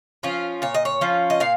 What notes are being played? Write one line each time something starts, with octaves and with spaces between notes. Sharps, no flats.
F3 C#4 F4
A#2 C#5
D#5
C#5
F3 C#4 F4
D#5
A#2 F5